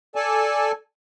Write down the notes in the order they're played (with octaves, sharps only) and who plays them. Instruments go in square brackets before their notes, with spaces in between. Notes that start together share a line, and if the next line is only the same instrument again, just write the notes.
[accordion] A4 D5 G#5 A5